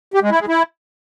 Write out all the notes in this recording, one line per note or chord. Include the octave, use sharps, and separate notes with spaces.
G4
G#3
E4
G#3
E4